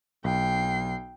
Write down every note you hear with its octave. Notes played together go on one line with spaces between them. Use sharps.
B1 G5 C7